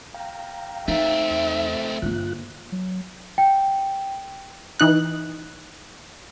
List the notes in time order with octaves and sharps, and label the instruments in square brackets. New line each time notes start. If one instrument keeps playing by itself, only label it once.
[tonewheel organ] F5 G5 A#5
[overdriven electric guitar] A3 C4 [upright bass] D#4 [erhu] E5
[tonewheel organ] E2
[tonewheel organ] G2 F4 F#6 [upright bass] D3 A#3
[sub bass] F#3
[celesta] G5
[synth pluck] E3 D#4 F#6